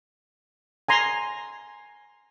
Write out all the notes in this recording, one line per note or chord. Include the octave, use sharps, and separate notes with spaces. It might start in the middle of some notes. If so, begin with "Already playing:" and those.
G#5 A#5 C6